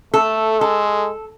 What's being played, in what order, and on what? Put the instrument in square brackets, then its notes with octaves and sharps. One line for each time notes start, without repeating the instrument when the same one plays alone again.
[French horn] A3 [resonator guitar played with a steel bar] A4
[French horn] G#3 [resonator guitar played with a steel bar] A4